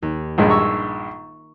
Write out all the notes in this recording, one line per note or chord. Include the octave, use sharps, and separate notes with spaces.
D#2
A#1 G2 G#3
A#5 C#6 E6